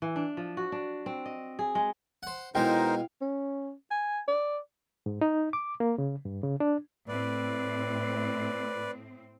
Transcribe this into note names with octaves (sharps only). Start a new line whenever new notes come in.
E3
D4
F3
F#4
D4
C4
D#5
G#4
G#3
C5 F#5
B2 G#3 D#4 E4 A#4 C5 F5 G5
C#4
G#5
D5
G#2
D#4
D6
A#3
C#3
G2
C#3
D4
A2 C4 B4 D5